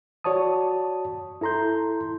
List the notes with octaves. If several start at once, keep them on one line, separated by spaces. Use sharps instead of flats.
F#4 C#5 D5 A5 D#6
E4 A4 A#5 C6 G6